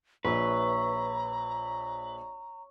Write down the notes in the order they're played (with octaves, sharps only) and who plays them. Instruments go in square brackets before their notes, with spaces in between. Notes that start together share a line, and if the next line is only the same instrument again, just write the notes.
[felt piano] A#1 [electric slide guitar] B4 [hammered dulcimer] C#5 E5 [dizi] A#5